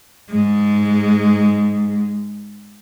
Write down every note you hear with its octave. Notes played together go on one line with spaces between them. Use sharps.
G#2 G#3